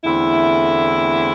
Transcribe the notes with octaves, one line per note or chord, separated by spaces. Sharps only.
E2 D3 A3 C4 E4